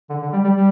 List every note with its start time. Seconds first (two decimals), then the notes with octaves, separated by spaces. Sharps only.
0.10 D3
0.22 D3
0.33 G3
0.44 G3
0.55 G3